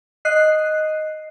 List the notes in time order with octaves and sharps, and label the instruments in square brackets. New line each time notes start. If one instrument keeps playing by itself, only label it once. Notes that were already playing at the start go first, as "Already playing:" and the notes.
[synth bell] D#5 F#6 C7